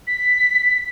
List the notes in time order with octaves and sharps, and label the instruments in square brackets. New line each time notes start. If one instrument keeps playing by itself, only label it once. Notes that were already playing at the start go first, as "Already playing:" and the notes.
[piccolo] B6